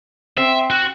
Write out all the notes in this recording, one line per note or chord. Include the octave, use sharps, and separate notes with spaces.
C4 E5
F#4